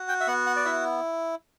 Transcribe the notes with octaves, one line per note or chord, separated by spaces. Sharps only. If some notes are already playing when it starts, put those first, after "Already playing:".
Already playing: F#4
G5
E5
B3 F#5
F#5
D5
E4 E5